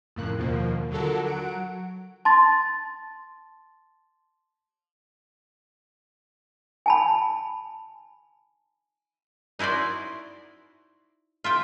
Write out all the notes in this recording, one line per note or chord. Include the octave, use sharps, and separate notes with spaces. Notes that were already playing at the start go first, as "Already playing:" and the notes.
F2 A2 C#3 A#3 F#6
D#2 B2 F3 A#3
D3 F#3 F4 F#4 A4 A#4
F#3 F#5 D7
A5 C6 A6
G#5 A5 B5
D#4 E4 F#4 C5 D5
F4 E5 G5